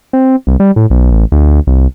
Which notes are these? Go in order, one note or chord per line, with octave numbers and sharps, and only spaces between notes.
C4
C2
G3
A2
B1
A1
D2
C2